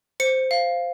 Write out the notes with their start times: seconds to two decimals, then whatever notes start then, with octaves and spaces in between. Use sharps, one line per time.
0.20 C5 C#7
0.51 F5